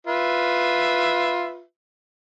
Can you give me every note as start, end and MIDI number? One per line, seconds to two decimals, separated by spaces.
0.07 1.62 65
0.07 1.62 71
0.07 1.62 76